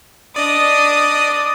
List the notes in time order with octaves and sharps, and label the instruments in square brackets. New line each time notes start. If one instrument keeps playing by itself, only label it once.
[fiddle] D4 D#6 [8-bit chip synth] D5 D#5